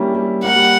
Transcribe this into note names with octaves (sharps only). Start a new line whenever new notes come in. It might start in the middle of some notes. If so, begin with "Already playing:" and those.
Already playing: G3 A#3 C#4 D4 E4
G3
A#3 F#5
G3